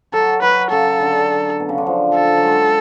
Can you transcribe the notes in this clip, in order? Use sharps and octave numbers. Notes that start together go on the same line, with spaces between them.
F#3 A4
F#3 B4
C#3 A4
D3
B2
C#3
D3
F3
A4
F#3
G#3